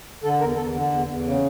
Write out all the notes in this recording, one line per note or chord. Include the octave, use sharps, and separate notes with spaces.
D3 A4
E2 A#4
E2 A4
D3
E2
E2
C#3